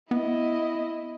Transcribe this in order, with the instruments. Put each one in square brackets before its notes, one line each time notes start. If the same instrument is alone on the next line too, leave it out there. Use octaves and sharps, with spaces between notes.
[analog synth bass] B3 [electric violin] E4 D#5